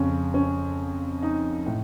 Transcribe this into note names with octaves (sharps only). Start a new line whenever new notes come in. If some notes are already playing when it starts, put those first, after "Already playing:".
Already playing: F2 C#3 C#4
C#4
D#4
A2